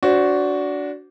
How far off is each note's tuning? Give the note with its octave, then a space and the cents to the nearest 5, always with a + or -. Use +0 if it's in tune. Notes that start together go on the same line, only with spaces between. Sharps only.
D4 -20 F#4 +0 C5 +0